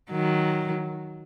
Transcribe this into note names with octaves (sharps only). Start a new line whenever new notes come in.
D#3 F#3